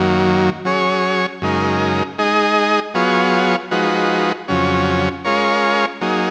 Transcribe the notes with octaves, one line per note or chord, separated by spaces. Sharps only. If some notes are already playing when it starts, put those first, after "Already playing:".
Already playing: F#2 D#3 F#3 A#3
F#3 C#4 G#4 C#5
F#2 C#3 G#3 D#4 A#4
G#3 D#4 G#4 D#5
F#3 B3 F4 G#4 C#5
F3 G#3 D#4 F#4 B4
F2 C#3 F#3 C#4
G#3 C#4 F4 A#4 C#5
F#3 A#3 D#4 G#4